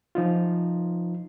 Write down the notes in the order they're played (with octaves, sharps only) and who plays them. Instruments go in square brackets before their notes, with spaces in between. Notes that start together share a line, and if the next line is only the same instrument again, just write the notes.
[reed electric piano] F3 D#4 F4